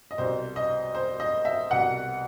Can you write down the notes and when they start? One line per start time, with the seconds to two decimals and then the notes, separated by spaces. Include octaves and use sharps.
0.11 D#5
0.18 C2 B2 C5
0.56 D#5
0.95 C5
1.20 D#5
1.45 E5
1.70 C2 B2 F#5